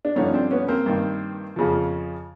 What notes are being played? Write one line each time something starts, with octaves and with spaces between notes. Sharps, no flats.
D4
G2 D3 F3 C#4 D#4
C4 D4
B3 C#4
A#3 C4
G2 D#3
F2 C#3 F3